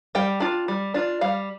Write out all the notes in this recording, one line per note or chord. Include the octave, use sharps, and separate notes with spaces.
G3 G5
D4 F4
G3
D4 F4
G3 F5